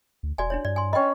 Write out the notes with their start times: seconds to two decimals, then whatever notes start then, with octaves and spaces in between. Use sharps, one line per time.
0.23 D2
0.38 E1 F#4 D5 G#5
0.50 D4 E4 C#5
0.65 G2 D5
0.76 G#5 C6
0.93 C#4 D#5 G5 B5